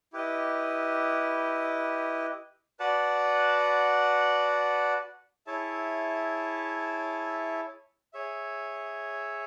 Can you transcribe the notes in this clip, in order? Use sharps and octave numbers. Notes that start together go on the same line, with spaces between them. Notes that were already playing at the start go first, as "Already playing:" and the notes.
E4 G4 B4 D#5
F#4 B4 D5 F#5 A5
E4 G#4 C#5 E5 A5
G#4 C#5 E5